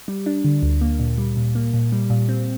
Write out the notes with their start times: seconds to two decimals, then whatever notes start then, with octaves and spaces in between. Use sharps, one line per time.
0.08 G3
0.26 D4
0.45 D3
0.63 D2
0.81 A#3
0.99 A#2
1.18 G3
1.37 A#2
1.55 A#3
1.74 A#2
1.92 G3
2.10 A#2
2.29 C4